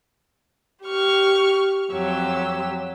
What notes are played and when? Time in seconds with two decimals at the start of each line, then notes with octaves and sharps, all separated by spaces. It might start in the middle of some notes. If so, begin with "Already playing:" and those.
0.84 G4 C#6 F6
1.93 F2 F#3 G4 E6